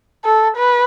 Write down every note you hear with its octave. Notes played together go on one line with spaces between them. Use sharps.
A4
B4